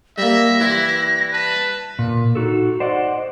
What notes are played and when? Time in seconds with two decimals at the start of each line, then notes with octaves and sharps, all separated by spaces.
0.18 G3 A#3 E5 A#6
0.60 E3 G3 E4 C6
1.33 B4 A5
1.99 A#2
2.35 D#4 F#4 A4
2.80 C5 D5 D#5 F#5